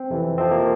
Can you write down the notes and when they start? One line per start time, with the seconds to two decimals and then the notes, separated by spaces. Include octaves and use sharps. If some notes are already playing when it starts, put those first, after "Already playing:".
Already playing: C4
0.10 F2 C3 E3
0.37 F2 C3 F3 C4
0.51 A#3